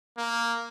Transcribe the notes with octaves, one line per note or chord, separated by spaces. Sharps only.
A#3